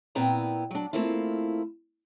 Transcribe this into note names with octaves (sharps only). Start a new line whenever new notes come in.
A#2 B3 C4 E4 G5 A#5
F#3 D4
A3 A#3 C4 E4 F4